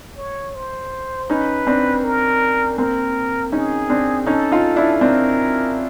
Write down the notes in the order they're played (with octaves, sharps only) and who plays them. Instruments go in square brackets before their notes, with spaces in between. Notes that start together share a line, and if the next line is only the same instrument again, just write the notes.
[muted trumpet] C#5
C5
[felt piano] C#4 D#4 [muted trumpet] B4
[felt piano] C4 D4
[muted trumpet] A#4
[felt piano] A#3 C4 [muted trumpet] A#4
[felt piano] C#4 D#4 [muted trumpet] G#4
[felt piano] C4 D4
[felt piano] C#4 D#4 [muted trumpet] A4
[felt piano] D#4 F4
D4 E4
[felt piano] C4 D4 [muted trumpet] A#4